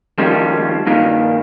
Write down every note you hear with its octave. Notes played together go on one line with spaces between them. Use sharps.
D#3 F3 G3 G#3 C#4
G2 A#2 D#3